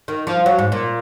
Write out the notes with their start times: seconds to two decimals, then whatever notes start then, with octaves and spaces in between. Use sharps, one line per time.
0.08 D#3
0.27 F3
0.46 F#3
0.59 G#2
0.72 A#2